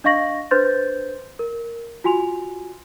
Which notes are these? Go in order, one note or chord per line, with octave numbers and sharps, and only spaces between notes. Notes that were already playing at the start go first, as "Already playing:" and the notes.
D4 D#5 F5 C#6 A#6 F#7
D4 B4 C5 C6 G6 A6
A#4
F4 F#4 G#5 C6 F7